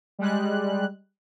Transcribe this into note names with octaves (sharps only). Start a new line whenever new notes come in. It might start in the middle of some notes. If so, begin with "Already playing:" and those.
G3 G#3 F#6